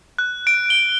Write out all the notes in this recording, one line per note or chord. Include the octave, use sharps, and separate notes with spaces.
F#6
D7
G7